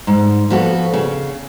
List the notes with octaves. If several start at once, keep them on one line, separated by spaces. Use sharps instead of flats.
G#2
F3 B3 F#4 A4
C#3